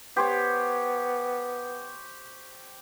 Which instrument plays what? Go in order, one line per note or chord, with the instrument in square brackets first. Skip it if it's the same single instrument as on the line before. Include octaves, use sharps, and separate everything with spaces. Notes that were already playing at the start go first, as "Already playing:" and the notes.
[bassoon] B3 [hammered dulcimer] G4 C5 C#5